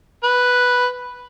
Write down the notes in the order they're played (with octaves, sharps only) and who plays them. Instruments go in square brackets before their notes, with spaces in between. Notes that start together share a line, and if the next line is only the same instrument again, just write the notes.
[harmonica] B4